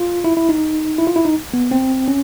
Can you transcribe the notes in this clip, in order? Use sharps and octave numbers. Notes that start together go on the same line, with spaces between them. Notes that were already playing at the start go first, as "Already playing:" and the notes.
Already playing: F4
E4
E4
D#4
E4
F4
E4
D#4
B3
C4
C#4